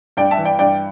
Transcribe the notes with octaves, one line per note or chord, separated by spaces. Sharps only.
G2 D5 G5
E5 A5
E3
D5 G5
G2 D5 G5